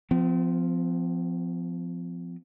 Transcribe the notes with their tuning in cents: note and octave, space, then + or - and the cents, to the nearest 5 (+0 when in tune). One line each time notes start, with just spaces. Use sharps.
F3 +0 C4 -40